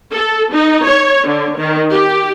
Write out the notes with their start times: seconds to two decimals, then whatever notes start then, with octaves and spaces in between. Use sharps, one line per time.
0.13 A4
0.53 D#4
0.86 C#5
1.27 D3
1.57 D#3
1.91 G4